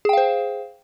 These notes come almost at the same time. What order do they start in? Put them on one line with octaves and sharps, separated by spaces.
G#4 G5 F5 C5